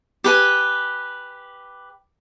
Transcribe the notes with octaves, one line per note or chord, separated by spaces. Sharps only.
G4 B4 G#5